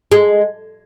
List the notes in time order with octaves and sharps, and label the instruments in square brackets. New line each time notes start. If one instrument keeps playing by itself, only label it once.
[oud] G#3